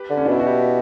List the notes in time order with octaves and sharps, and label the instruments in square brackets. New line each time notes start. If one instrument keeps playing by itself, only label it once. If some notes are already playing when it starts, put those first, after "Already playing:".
Already playing: [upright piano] G4 B4
[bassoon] D3
[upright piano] C#4
D4
[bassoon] B2 [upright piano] E4
[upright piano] F#4
E4 G4